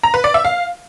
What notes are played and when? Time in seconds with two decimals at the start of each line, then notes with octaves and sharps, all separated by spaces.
0.03 A#5
0.14 B4
0.24 D5
0.34 E5
0.45 F5